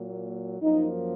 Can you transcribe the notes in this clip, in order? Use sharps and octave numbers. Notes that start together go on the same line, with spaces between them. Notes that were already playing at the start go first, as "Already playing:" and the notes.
Already playing: A#2 F#3 A#3
F#2 F3 A#3 D#4